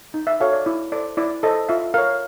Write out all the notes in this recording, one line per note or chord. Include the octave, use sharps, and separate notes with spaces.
D#4
E5
F#4 A4 C#5 F5
D5
E4
A4 C5 D5
E4 D5
A4 C5 D#5
F4 E5
A#4 C#5 F5